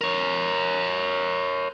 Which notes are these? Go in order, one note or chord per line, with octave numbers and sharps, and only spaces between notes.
A#4 C#5